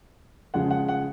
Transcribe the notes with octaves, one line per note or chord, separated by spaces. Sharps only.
C#3 F3 G#3 F#5
F#5
F#5